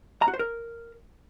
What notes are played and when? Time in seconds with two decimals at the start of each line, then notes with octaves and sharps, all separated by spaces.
0.22 A#5
0.28 F#4
0.34 C5
0.39 A#4